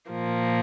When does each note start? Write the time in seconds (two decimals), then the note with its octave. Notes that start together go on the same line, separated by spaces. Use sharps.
0.10 A#2 F3 A#3